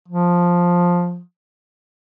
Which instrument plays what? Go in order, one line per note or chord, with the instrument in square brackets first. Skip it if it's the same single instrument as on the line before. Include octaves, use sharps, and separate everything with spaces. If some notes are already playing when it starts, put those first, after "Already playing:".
[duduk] F3